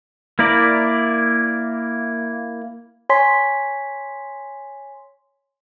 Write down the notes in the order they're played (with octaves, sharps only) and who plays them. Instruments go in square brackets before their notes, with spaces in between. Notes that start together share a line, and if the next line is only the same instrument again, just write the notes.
[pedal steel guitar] A#3 E4 A#4 D5
[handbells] C#5 G#5 C6 B6